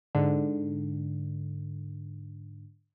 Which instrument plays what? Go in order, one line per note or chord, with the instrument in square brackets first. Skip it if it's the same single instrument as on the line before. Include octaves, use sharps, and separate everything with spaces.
[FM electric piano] G#2 D3